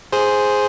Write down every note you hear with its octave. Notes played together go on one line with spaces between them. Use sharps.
G#4 C5